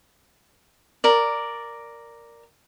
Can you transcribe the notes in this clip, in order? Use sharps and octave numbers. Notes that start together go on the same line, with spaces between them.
A#4 D5